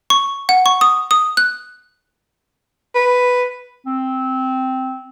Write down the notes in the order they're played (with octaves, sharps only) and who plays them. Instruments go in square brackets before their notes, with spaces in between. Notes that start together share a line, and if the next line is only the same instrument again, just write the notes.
[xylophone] C#6
F#5
C#6
D#6
D#6
F#6
[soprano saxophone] B4
[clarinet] C4